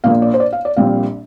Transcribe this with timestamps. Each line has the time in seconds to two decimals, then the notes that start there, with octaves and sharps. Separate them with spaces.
0.04 A#1 A#2 A#3 F5
0.22 D5
0.34 C5
0.40 D5
0.53 F5
0.65 D5
0.76 A#1 A#2 G3 C4 F5